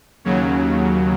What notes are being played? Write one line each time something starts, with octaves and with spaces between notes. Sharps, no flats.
D#2 C#3 F#3